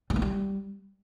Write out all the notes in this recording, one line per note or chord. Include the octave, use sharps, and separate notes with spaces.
G3
A#3
G3